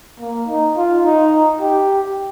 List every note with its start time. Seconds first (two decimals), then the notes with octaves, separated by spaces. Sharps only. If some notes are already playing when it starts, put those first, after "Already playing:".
0.20 A#3
0.48 D#4
0.77 F4
1.04 D#4
1.61 G4